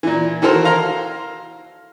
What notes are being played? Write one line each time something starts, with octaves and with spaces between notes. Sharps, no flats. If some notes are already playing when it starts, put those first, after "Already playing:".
A#2 E3
D#3 E3 F#4 A4 A#4 C5
F5 A#5 C6 F6